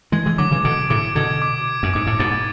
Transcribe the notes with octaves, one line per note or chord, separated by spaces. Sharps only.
E3 G#3 G#6
E3 G#3
D3 F#3 D6
C#3 E3
B2 D3 D7
A2 C#3 D6
B2 D3 G#6
D6
D7
F#2
G#2 D6
A2
G#2 B2 A6